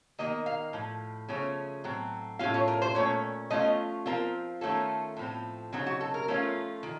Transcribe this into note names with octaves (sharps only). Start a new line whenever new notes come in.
D#3 A#3 D#4 D#5
F5
A2 F3
C#3 F3 A3 C#4
A2 F#3 C4
A2 A3 C#4 F4 F5
C#5
A#4
C5
A#2 A3 C#4 C#5
F3 A3 C#4 F4 D#5
F3 C4 F4 A#4
D#3 A3 C#4 F4 A4
A2 F3 C4
C#3 F#3 C4 D#4 F#4
F#4
A4
A#4
F3 A3 C#4 F4
D#3